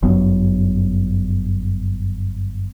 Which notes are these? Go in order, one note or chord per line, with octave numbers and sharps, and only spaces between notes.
G1 F#2 F#3 B3